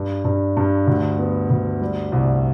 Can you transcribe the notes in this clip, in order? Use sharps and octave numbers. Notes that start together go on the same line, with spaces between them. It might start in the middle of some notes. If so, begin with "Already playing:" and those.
Already playing: G2
G2
G2
D2
B3
D2
G3
C2